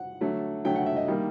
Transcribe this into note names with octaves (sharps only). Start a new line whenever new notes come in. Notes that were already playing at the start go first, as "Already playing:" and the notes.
Already playing: F#5
D3 F#3 A3
D3 F#3 A3 G5
F#5
E5
D#5
D#3 G3 A#3